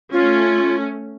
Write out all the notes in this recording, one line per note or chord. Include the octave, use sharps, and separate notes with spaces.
A3 C#4 F4